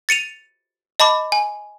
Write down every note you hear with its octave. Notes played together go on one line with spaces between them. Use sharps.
A6 C#7 D#7 F7
D#5 A5 B5 D6
G#5